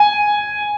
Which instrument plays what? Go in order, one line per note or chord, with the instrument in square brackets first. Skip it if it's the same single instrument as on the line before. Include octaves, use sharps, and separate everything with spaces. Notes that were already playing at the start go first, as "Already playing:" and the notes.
Already playing: [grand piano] G#5